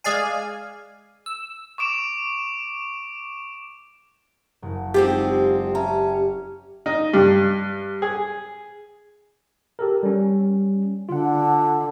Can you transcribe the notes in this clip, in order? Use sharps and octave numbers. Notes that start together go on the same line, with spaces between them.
G#3 G#4 D5 F5 G#5
E6
C#6 D6 D7 E7
F#1
G#3 C4 D#4 F4 G4
C#4 E5 A5 A#5
D#4
G2
G#4
G4 A4 A#4
G3 C#4
D3 F4 F#5